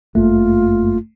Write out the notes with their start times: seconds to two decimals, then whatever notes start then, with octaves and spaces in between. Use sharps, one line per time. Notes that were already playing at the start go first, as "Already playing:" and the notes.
0.15 G1 F#2 A3 A#3 F4